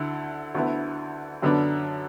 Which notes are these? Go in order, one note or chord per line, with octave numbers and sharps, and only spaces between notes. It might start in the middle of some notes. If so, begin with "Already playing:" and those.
Already playing: D2 D3 E4
D2 D3 B3 E4
F#2 D3 B3 D4